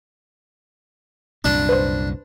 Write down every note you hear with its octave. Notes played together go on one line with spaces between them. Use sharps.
C2 F#2 A#2 D4
B4 C5